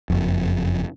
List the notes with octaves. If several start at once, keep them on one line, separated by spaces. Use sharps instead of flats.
F#1 F2